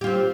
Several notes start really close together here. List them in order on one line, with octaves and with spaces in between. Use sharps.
G4 F4 C4